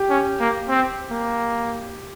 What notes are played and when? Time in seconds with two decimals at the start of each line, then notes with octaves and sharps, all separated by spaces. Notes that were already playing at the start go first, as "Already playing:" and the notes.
Already playing: G4
0.10 C#4
0.40 A#3
0.68 C4
1.11 A#3